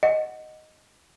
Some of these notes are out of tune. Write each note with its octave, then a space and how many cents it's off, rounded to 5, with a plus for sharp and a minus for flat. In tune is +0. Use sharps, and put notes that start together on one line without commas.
D#5 +0 F#5 +0